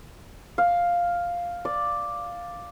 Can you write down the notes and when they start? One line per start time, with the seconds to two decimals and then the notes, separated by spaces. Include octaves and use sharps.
0.58 F5
1.65 D5